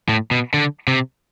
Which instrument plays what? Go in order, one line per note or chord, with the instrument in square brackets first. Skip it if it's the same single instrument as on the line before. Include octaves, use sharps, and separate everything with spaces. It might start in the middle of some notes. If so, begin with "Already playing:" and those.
[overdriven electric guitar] A2
B2
D3
C3